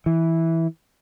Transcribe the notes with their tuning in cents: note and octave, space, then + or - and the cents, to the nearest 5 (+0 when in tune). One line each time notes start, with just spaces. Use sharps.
E3 -5